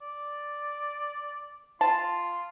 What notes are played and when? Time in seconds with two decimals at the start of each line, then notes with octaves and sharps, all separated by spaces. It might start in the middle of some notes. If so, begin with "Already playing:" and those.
0.02 D5
1.81 F4 A5